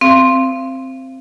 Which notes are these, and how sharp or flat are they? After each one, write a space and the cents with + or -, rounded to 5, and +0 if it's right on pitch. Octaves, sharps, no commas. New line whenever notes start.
C4 +0 F5 -25